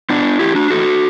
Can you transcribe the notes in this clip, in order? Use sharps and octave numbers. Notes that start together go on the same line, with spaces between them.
B2 B3 D4
A2 E3 E4 G4
D4 F#4
A2 E3 F#4 A4